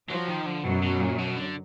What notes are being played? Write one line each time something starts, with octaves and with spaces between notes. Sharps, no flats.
F3 F#3
D#3
D3
F#2 B2 F#3
B2
A#2
B2
D3